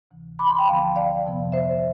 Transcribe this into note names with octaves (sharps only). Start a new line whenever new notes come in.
D2 C3 E3
B5 D6
A5 C6
G5 B5
D2 D3 F3 B3 F5 A5
D5 F5
F2 C3 F3 B3
C5 E5